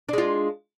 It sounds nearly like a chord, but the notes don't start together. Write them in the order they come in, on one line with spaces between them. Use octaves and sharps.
D4 G#3 F4